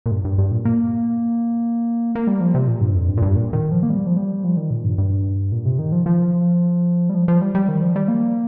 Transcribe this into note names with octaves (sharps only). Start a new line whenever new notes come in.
A#2
G2
G2
G2
A#2
A#3
A#3
G3
F3
C3
A#2
G2
F2
G2
A#2
G2
A#2
D#3
F3
A#3
G3
F3
G3
F3
D#3
A#2
G2
G2
A#2
C3
D#3
F3
F3
G3
F3
F3
G3
G3
D#3
F3
G3
A#3